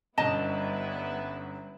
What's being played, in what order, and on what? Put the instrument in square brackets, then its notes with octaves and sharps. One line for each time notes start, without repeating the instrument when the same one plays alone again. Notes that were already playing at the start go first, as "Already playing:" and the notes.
[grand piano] G1 F#2 [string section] G3 B3 E4 [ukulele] D#5 A5